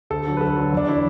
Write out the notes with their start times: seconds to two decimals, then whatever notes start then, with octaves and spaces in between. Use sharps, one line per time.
0.10 D2 A4
0.27 D3 F#3
0.37 B4
0.41 D2 A4
0.56 D3 F#3
0.73 E2 D4
0.87 D3 F#3 E4